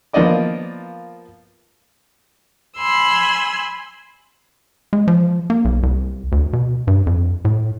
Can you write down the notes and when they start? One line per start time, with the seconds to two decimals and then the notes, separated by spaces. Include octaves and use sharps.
0.13 F3 A#3 B3 D5 D#5 D6
2.77 G#5 B5 C6 E6
4.93 G#3
5.08 F3
5.50 A#3
5.65 B1
5.83 C2
6.32 D2
6.53 B2
6.87 G2
7.07 F2
7.45 A2